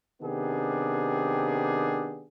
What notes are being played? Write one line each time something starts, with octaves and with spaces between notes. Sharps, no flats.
C3 D#3 B3 D4 G4 G#4